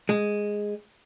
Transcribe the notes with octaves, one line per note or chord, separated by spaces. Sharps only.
G#3